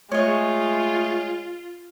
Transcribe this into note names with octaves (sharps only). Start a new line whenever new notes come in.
G#3 A3 F4 C#5 D#5